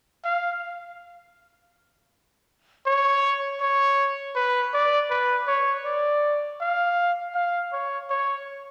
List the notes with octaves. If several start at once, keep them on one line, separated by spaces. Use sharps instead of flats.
F5
C#5
C#5
B4
D5
B4
C#5
D5
F5
F5
C#5
C#5